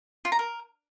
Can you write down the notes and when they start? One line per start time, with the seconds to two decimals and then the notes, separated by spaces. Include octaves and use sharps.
0.25 F4
0.32 A#5
0.39 A#4